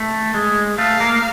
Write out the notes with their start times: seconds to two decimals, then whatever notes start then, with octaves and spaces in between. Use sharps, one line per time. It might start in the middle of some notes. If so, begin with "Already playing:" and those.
Already playing: A3
0.34 G#3
0.78 A3 F5
1.00 A#3